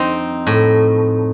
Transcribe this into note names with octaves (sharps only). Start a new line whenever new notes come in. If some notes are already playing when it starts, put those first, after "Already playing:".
Already playing: F2 C4 D#4
A2